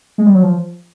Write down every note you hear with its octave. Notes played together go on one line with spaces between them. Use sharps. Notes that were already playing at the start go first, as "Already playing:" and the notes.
G#3
G3
F#3
F3